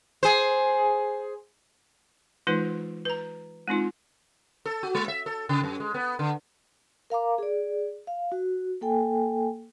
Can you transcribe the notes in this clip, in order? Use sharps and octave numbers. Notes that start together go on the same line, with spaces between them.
G#4 C5
E3 G#3 D#4 F4 B4
B4 A#5
G#3 C4 D#4 F4
A4
F#4
G#3
E5
A4
C#3
F#2
G#3
B3
D3
A#4 F5 A#5 D6
G#4 D5
F5
F#4
A#3 A4 G5 G#5